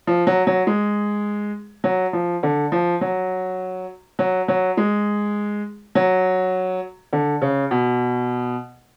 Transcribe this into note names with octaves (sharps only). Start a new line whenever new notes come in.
F3
F#3
F#3
G#3
F#3
F3
D3
F3
F#3
F#3
F#3
G#3
F#3
D3
C#3
B2